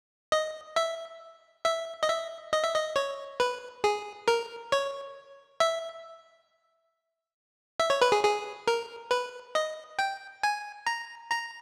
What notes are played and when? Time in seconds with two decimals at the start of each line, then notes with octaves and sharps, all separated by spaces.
0.32 D#5
0.76 E5
1.65 E5
2.03 D#5
2.09 E5
2.53 D#5
2.63 E5
2.75 D#5
2.96 C#5
3.40 B4
3.84 G#4
4.28 A#4
4.72 C#5
5.60 E5
7.80 E5
7.90 C#5
8.02 B4
8.12 G#4
8.24 G#4
8.68 A#4
9.11 B4
9.55 D#5
9.99 G5
10.43 G#5
10.87 A#5
11.32 A#5